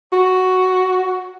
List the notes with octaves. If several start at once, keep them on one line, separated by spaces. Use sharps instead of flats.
F#4